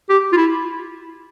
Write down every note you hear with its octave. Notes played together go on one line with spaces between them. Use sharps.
G4
F4
E4